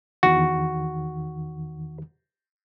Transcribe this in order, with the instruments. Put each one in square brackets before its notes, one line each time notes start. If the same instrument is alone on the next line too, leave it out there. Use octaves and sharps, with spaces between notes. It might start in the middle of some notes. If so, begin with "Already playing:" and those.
[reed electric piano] E2 D#3 [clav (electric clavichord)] F#4